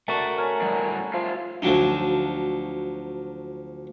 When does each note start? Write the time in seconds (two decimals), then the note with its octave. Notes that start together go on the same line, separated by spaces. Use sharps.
0.08 A3 F#4 A#4 A5
0.38 C#4 A#4
0.62 A2 F#3 G3
1.14 F3 F4 E5 F5
1.62 D2 F3 F#3 D4 D#4